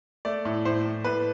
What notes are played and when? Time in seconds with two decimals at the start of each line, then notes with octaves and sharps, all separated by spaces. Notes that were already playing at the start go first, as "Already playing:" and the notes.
0.25 A3 D5
0.45 A2
0.65 A2 C5
0.85 A2
1.04 A2 B4